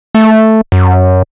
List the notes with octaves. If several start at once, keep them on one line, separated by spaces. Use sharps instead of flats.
A3
F#2